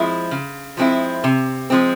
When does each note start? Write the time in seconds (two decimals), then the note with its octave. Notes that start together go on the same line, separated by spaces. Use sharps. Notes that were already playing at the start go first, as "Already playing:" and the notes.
Already playing: F3 G#3 C4 E4
0.31 C#3
0.77 F3 G#3 C4 E4
1.24 C3
1.70 F3 G#3 C4